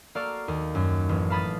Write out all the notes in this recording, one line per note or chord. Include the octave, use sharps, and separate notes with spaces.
A#3 F#4 A4 D5 F5
D#2
F#2
A1
F5 A5 B5 D#6 A6